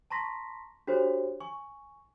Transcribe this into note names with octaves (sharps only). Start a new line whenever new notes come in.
A5 A#5 C6 C#6 A#6 B6
D4 F#4 G4 A4 C5 C#5
G#5 C#6